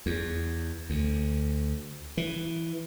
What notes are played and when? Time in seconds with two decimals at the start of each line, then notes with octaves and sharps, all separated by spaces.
0.06 E2
0.90 D2
2.17 E3